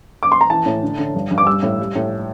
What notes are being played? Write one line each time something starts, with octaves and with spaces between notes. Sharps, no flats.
D6
C6
A#5
E3 A5
A2
D3
D3
G2
G2
D6
G3 E6
A2
G3
A2